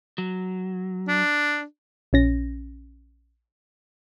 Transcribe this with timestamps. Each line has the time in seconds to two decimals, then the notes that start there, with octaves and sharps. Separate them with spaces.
0.18 F#3
1.08 D4
2.13 A#1 C#4 A#6